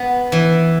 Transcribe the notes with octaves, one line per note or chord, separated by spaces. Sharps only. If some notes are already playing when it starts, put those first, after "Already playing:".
Already playing: B3
E3